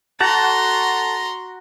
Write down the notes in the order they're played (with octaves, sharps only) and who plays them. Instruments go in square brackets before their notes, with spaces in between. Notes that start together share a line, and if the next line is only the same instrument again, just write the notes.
[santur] F#4 [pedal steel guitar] A4 F#5 A5 [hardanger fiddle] A#5 C6